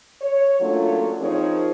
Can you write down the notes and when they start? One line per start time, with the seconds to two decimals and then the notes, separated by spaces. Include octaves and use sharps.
0.21 C#5
0.60 F#3 A3 A#3 C#4 D4 F4
1.20 F3 C4 D#4 G#4 A#4 C#5